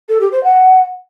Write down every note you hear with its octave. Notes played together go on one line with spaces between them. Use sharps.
A4
G4
C5
F#5